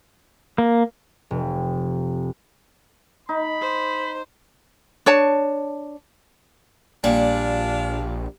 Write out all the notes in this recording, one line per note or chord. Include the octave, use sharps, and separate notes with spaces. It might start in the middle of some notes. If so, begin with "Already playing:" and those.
A#3
F1
D#4 B5
C5
D4 C#5 A5
A#1 A#2 G3 D4 F5